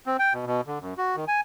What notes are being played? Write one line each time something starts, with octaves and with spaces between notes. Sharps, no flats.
C4
G5
B2
B2
D3
F#2
F#4
D#3
G#5